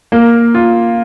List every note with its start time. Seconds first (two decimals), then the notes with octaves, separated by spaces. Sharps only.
0.12 A#3
0.55 F4